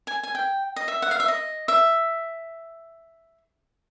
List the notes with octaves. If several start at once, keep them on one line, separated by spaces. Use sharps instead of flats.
G#5
G#5
G5
D#5
E5
F#5
F5
E5
D#5
E5